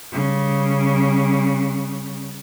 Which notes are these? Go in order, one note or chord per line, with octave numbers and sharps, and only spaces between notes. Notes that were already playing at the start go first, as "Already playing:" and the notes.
C#3 G3